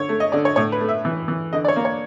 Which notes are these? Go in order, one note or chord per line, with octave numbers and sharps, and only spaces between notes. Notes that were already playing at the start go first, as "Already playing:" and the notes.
Already playing: D3 C#5
A3
D#5
D3 D5
C#5
A2 C#5
B4
A3
E5
E3
E3
D3 D#5
D5
C#5
A#3
C#5